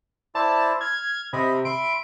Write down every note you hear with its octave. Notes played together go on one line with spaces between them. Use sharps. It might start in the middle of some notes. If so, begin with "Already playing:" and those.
E4 C5 D5 A5
F6 G#6
C3 D#5 B5
E5 B5 C6 D7